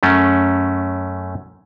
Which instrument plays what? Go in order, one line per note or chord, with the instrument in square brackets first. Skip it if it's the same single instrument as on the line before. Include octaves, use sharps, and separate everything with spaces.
[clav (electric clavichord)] F#2 A3 C#4